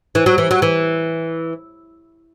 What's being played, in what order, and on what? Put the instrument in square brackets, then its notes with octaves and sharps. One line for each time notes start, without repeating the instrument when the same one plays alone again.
[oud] E3
F#3
E3
F#3
E3